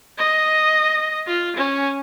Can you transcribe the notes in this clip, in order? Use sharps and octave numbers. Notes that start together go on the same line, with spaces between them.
D#5
F4
C#4